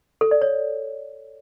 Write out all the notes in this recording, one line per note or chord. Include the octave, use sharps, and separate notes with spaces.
A4
D5
C#5